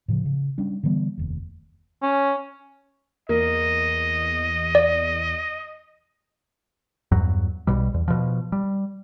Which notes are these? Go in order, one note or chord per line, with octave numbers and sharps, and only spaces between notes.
A2 C#3 F3
C#3
G3 C#4 D4
D3 E3 G3 B3
F1 D#2
C#4
E2 A#3 D#5
D5
E2 G2 F#3
B1 B2 G3
E2
B2 F3
G3